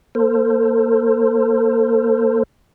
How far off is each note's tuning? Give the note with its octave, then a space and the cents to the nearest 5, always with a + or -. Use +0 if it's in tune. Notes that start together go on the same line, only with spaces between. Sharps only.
A#3 +0 A4 +40 C5 +0